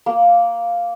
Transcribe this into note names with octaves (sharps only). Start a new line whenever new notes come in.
A#3